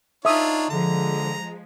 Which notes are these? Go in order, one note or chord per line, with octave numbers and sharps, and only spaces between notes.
D4 D#4 F4 C#5 E5 D#6
D3 F3 G#3 A#5